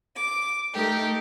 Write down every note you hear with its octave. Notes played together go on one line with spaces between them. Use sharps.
D6
A3 D#4 G4 A#4